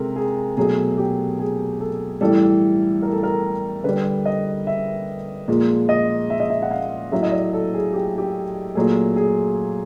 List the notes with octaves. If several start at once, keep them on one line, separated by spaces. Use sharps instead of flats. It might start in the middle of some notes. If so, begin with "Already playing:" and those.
Already playing: C3 G#3 A4 A#4
G#4
B2 F#3 A3 G#4
G4
G#4
A4
A2 E3 G3 A4
A#4
A4
A#4
D3 G3 B4
D#5
E5
A#2 F3 G#3
D#5
E5
D#5
E5
F#5
F5
A2 F#3 A3 E5
D#5
D5
A4
G#4
G4
G4
A#2 F#3 A3 G#4
G#4